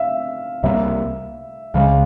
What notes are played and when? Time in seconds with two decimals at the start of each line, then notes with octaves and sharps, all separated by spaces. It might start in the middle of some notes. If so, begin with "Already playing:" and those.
Already playing: E5 F5
0.63 C2 C3 G3 A#3 E5
1.74 C#2 C#3 F3 F5
1.79 G#3